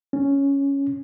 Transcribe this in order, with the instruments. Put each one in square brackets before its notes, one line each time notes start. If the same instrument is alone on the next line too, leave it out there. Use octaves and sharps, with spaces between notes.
[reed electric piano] C#4